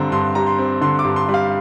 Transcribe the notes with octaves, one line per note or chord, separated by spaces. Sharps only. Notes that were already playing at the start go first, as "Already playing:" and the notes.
Already playing: G2 D3 G3 C4 A#5
G2 C6
G3 A#5
C6
C4
D3 C6
D6
G2
C6
G3
F5